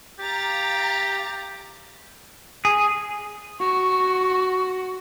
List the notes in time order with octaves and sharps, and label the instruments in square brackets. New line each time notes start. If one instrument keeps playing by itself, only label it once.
[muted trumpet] G4 [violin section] F5 A#5 A6
[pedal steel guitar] G#4
[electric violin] F#4 [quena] C#6